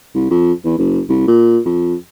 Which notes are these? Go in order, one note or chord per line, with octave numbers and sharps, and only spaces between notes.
C2
F2
E2
F#1
C2
A#2
F2